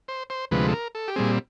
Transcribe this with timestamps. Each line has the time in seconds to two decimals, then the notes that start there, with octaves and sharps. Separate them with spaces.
0.08 C5
0.30 C5
0.51 D2 C3 F3 G#3 B4
0.68 A4
0.73 A#4
0.95 A4
1.08 G4
1.16 A#2 G3 C4 G#4